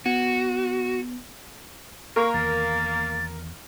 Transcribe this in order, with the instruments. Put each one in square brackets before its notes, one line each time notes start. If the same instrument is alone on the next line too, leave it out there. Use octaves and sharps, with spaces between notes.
[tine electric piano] B3 [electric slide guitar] F#4
[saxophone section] A#3 [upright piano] A#4 [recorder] C#6
[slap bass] E2 D#3 [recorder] A6